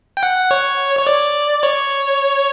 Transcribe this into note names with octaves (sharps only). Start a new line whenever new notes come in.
G5
F#5
C#5
C#5
D5
C#5